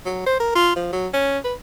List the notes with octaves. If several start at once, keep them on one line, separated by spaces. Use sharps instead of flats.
F#3
C5
A#4
F4
F3
F#3
C#4
B4